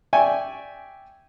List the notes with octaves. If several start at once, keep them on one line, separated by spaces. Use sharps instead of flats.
D5 E5 G5 G#5 C#6